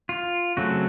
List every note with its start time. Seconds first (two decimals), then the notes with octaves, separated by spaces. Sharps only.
0.09 F4
0.57 C#3 F#3 A3 C4 F#4